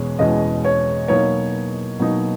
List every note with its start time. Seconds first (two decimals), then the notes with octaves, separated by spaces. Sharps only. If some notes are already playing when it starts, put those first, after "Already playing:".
Already playing: E2 B2 G#3 C#4
0.19 E2 B2 G#3 C#4 D#5
0.65 C#5
1.08 B2 F#3 A#3 D#4 C#5
1.99 B2 F#3 A#3 D#4